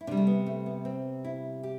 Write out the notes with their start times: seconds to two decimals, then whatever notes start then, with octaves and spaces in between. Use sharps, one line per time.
0.01 E4
0.07 C3 G3 D4
0.17 A3
0.27 B3
0.46 A3
0.66 B3
0.85 C4
1.24 E4
1.63 G4